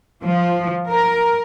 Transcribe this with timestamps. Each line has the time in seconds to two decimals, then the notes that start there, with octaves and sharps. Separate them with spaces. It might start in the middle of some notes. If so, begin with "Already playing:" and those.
0.24 F3
0.89 A#4